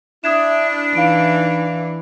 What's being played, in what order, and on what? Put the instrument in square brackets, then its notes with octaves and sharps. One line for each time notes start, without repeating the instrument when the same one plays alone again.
[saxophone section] D4 E4 [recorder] E5 [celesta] D#6 G#6 E7
[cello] E3 [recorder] D#4 [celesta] F5 D7